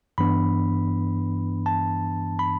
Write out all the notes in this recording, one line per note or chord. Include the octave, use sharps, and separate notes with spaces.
G2 E3 B3 D4 B5
A5
B5